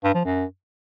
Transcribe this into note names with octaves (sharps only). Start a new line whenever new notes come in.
G2
F3
F#2